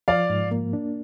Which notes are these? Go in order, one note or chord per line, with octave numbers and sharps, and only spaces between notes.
F3 D5 F5
G#2
A#3
D4